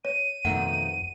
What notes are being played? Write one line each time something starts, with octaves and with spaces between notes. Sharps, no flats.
C#5 D#7
F2 B2 D#3 A3 F#5